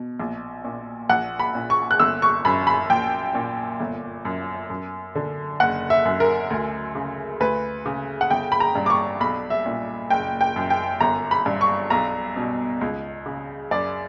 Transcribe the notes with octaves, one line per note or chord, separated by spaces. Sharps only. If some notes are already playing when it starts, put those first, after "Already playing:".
Already playing: B2
A#1
A#2
A#1 F#5
B5
A#2
C#6
F#6
G1 E6
C#6
F#2 B5
B5
A#1 G5
A#2
G1
F#2
F#2
D3
F#1 F#5
E5
F#2
A#4
D2
C#3
D2 B4
C#3
F#5
G1 G5
B5
A#5
G2
D6
C#6
B1 B5
E5
A#2
F#1 G5
G5
F#2
G5
G1 A#5
B5
G2
C#6
B1 A#5
B2
C#2
C#3
F#2 D5